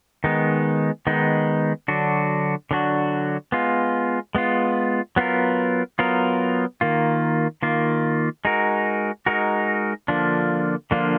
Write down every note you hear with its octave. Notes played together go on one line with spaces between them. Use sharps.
D#3 G#3 B3 D#4
D#3 G#3 B3 D#4
D3 F#3 D4 F#4
D3 F#3 D4 F#4
G#3 B3 F4
G#3 B3 F4
F#3 B3 F4 A#4
F#3 B3 F4 A#4
D#3 A#3 F4
D#3 A#3 F4
G#3 D#4 F#4 A#4
G#3 D#4 F#4 A#4
D3 F3 A#3 D4 F4
D3 F3 A#3 D4 F4